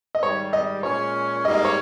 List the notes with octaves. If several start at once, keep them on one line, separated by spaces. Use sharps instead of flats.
D#5
G#2 D#3 G3 C#5
D#5
A#2 G#3 C#4 C#5
G#2 G3 A#3 D#5
D#5
C#5